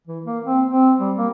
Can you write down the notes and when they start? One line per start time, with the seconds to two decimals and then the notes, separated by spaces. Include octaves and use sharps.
0.07 E3
0.25 A#3
0.45 C4
0.67 C4
1.00 G3
1.18 A#3